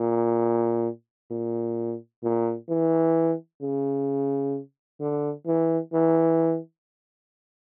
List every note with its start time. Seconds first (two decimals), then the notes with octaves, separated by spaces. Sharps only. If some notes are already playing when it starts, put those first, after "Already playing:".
Already playing: A#2
1.31 A#2
2.23 A#2
2.69 E3
3.62 C#3
5.00 D3
5.46 E3
5.93 E3